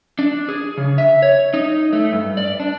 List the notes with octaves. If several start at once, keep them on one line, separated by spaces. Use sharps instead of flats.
D4
G#4
C#3
E5
C#5
D#4
A3
G2
D5
D4